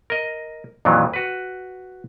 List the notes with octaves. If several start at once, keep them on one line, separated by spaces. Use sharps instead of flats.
A#4 D#5
F2 A#2 D#3 E3 F#3
F#4 B4